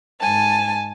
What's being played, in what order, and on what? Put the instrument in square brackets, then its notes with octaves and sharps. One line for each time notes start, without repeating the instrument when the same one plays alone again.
[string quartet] G#2 G#5 A5